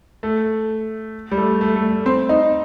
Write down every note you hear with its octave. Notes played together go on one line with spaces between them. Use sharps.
A3
G3
A3
A3
A3
C4
D#4